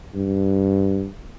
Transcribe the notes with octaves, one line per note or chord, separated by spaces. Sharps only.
G2